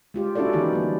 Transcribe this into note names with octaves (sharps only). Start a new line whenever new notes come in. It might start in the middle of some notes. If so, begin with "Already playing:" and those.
G#3 F4 G4
C#4 D4 E4 F#4 A4 D5
D3 E3 A#3 D#4 E4 G4
G3 A#3